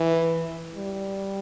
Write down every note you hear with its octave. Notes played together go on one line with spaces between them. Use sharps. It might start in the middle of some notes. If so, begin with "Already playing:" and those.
Already playing: E3
G3